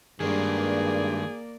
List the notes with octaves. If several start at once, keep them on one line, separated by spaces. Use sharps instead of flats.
G2 D#3 G#3 A#3 G#4 D5